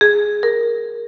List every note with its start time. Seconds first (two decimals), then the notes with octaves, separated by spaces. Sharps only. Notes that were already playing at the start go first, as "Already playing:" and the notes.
0.01 G#4
0.43 A#4